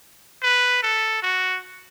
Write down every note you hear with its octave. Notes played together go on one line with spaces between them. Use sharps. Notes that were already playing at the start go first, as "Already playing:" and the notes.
B4
A4
F#4